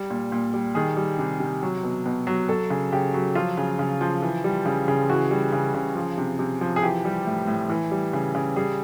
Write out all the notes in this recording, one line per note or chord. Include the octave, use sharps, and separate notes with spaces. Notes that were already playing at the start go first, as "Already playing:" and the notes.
Already playing: G3
A#2
A#2
G3
D#3 G#4
G3
C3
C3
F#3
B2
B2
F#3
F#3 A4
C#3
C#3 G4
F#3
F3 F4
C#3
C#3
F3
E3
G3
C#3
C#3
E3 F#4
G3
C#3
C#3
F3
C3
C3
F3
G#4
E3 G4
G3
A2
A2
E3
G3
C#3
C#3
G3 G#4